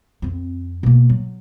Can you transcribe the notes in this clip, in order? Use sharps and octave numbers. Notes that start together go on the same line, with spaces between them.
F2 C4
B2 A#3
F#3